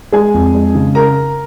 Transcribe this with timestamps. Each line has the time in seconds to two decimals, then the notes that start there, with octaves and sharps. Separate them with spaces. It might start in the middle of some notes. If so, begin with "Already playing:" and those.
0.12 G#3 G#4 G#5
0.34 F2
0.54 G#3
0.75 C#3
0.95 A#4 A#5